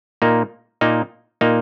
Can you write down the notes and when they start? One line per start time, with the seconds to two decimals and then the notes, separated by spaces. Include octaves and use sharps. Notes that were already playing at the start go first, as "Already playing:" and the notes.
0.22 A#2 A#3 D#4
0.81 A#2 A#3 D#4
1.41 A#2 A#3 D#4